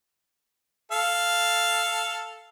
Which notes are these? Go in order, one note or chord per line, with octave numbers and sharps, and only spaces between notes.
A4 F5